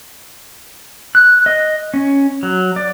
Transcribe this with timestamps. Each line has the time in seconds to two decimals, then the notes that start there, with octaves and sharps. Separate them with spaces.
1.15 F#6
1.46 D#5
1.94 C#4
2.43 F#3
2.76 D5